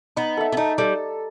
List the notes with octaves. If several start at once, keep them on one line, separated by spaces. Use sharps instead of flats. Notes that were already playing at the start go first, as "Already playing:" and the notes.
B3 D#4
A4 E5
B3
A3 D#4
G3 A4